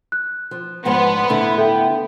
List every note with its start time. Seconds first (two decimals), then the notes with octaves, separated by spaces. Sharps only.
0.12 F#6
0.51 F3
0.85 G#2 F3 B3 D4 F#5 C6
1.28 A2 D3 E4
1.58 A4 E5 G5